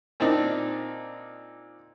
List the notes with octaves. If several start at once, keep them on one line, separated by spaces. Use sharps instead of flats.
A#2 C4 D4 D#4